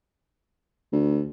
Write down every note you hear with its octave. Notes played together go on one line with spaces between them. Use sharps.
D2